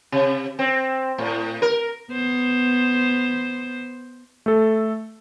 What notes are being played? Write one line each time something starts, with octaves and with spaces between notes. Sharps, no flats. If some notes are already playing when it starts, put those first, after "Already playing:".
C3
C4
A2
A#4
B3 C5
A3 A4